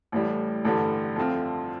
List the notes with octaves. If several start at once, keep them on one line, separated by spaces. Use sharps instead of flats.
A1 A2 G3
A1 G2 D3 G3
F2 D3 A3 C4 F4